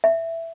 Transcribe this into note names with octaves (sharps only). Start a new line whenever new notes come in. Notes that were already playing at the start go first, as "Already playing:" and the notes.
E5